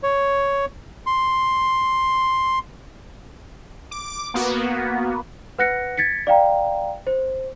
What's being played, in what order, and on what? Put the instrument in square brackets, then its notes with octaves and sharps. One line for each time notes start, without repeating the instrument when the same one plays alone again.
[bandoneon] C#5
C6
[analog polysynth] D6
A#3 B3 F#4
[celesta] B4 F#5 F#6 A#6 C#7
G#6 A6 B6 C#7
D5 F5 G5 A#5
C5